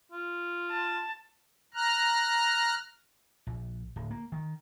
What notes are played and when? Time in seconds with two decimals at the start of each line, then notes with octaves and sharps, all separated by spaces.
0.12 F4
0.70 A5
1.74 A#5 F6 F#6
3.47 A#1
3.96 D1
4.11 A#3
4.32 D#3